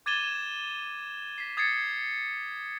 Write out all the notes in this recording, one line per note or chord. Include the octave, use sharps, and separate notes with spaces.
D6 G#6 A6 D#7 E7 G7
B6 C7
D#6 G#6 A6 C7 C#7